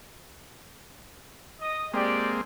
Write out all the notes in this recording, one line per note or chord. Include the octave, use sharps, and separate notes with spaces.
D#5 D#6
G#3 A#3 C4 G4 D5